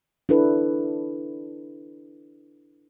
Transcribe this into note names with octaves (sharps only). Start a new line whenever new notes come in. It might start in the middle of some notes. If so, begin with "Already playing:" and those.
D4 E4 A4 B4